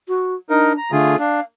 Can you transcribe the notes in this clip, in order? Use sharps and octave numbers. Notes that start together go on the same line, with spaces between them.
F#4
D4 D#4 A#4
A#5
D3 A3 F4 G#4
D4 F5